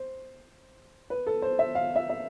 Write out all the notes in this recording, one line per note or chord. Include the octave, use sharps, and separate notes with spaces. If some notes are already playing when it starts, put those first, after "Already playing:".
Already playing: C5
B4
A4
C5
E5
F5
E5
E5